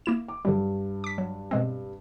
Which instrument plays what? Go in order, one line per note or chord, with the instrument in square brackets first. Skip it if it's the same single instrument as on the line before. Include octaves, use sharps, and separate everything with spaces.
[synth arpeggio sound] A#3 E4 E7
[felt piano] D6
[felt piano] G2 [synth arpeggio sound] D3 F#3 G3
[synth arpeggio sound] D6 B6
F#3
B2 G#3 C4